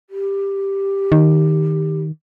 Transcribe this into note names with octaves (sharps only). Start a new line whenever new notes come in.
G4
D#3